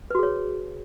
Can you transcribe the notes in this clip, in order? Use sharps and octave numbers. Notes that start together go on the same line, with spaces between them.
F#4 G#4 B4 C#5